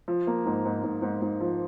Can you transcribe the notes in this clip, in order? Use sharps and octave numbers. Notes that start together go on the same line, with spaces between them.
F3
A#3
G#2
G#2
G#2
G#2
G#2
F3